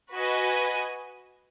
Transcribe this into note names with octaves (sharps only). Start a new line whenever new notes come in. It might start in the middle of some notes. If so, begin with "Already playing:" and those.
F#4 B4 D#5 G#5